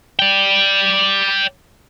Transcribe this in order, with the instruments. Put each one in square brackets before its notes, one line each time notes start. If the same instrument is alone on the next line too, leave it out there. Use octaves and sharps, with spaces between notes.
[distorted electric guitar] D5 G5